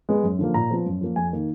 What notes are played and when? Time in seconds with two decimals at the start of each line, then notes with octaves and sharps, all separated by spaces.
0.09 G#3 B3
0.23 F#2
0.39 D3 F3 A#3
0.54 A#2 A#5
0.71 F3 B3
0.86 F#2
1.01 F3 A#3
1.16 F2 G#5
1.33 D#3 A#3